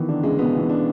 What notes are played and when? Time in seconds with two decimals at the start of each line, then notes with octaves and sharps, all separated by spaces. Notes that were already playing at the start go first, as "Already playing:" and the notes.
Already playing: D#3 E3 B3
0.09 D3 D4
0.23 C#3 G#3
0.39 B2 B3
0.55 B2 E3
0.70 D4